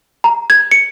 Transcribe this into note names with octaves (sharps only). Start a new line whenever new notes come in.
A#5
G#6
C#7